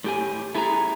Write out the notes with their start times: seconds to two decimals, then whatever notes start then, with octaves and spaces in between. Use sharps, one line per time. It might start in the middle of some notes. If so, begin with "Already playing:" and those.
0.04 A2 G4 G#5
0.55 A3 E4 G#4 A5 A#5